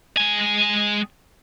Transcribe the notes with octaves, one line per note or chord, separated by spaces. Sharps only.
G#3 G#5